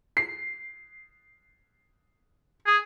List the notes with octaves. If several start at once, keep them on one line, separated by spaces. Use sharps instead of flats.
C7
G#4